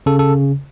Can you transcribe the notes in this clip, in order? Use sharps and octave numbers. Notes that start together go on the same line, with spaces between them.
C#3 A4
A4